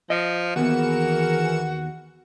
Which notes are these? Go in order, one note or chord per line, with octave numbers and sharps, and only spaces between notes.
F3 D#5
D#2 E3 B3 F#4 G#4 A#4 C#7 E7